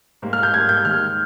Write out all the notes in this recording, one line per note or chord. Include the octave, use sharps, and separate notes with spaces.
G#2 G3 A#3
F6
G6
G#2 G3 A#3 G#6
G6
D#2 D#3 G#3 F6